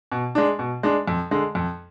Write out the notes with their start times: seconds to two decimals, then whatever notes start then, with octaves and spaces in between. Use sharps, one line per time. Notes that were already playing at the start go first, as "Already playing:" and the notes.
0.12 B2
0.35 G#3 D4
0.59 B2
0.83 G#3 D4
1.08 F2
1.31 D3 G#3
1.55 F2